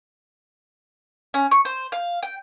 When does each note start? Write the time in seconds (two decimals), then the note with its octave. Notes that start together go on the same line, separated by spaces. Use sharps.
1.34 C#4
1.51 C#6
1.65 C5
1.92 F5
2.23 G5